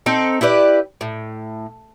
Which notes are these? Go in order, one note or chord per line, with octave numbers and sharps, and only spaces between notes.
C4 D#4 A4
E4 G4 B4 D5
A2